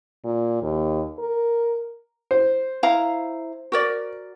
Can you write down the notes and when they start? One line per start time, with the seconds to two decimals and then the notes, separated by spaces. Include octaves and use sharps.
0.24 A#2
0.62 D#2
1.19 A#4
2.31 C5
2.83 E4 F5 A#5
3.72 F#4 A#4 D5